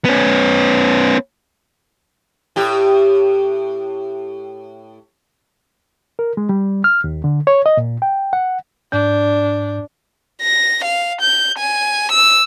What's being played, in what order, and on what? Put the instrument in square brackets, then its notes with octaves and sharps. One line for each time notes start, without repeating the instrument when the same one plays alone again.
[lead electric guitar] B3 C#4
[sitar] A2 G4
[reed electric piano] A#4
G#3
G3
F6
D#2
D3
C#5
D#5
A#2
G5
F#5
[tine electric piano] G#2 G6 [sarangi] D4
[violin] A#6
F5
G6
G#5
E6